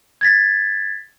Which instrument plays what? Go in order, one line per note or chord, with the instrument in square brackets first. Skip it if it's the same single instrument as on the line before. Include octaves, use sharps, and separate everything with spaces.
[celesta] G#6 A6 B6